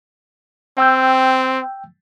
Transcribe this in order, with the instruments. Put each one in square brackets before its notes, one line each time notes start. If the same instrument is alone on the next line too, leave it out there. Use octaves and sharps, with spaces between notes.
[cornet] C4 [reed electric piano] G5 E6 G6